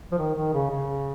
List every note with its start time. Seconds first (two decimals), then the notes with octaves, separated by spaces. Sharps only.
0.12 F3
0.19 D#3
0.36 D#3
0.53 C#3
0.71 C#3